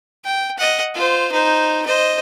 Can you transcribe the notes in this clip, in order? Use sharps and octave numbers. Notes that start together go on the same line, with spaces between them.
G5
D#5 F#5
F4 C5
D#4 C5
C5 D#5